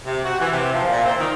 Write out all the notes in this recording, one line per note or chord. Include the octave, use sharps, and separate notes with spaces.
C3
F#4
E3
C3
F3
A#2
C4
D#3